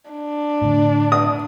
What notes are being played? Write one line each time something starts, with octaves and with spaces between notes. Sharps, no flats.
D4
A2 D3
D#6